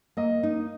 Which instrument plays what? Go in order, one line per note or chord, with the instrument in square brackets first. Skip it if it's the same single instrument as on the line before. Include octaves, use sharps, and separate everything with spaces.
[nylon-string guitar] A#3 [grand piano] D#5
[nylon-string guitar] D#4